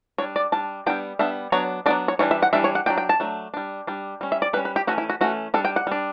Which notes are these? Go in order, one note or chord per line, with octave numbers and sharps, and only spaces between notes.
G3 D4 C#5
D5
G3 D4 A5
G3 B3 D4 G5
G3 B3 D4 E5
F#3 B3 D4 C#5
F#3 B3 D4 D5
C#5
E3 G3 D4 C#5
E5
F#5
E3 G3 D4 E5
C#5
F#5
F#3 A3 D4 G5
G5
A5
F#3 A3 D4
G3 D4
G3 D4
G3 C#4
E5
D5
G3 C#4 B4
B4
G4
E3 A3 C#4 F#4
E4
F#4
E3 A3 C#4 F#4
G3 D4 A4
G5
F#5
G3 D4